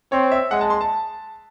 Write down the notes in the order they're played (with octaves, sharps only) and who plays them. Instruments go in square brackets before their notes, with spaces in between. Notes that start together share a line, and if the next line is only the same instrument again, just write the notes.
[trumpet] C4 [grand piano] C#5
[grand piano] E5
[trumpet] G#3 [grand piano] F#5
[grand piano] A5
C6
A5